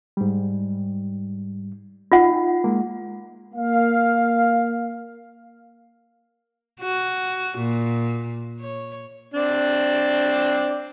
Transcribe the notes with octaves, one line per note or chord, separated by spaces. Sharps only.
G#2 G3
D#4 F4 F#5
G#3 A#3
A#3 F5
F#4
A#2
C#5
C4 D4 D5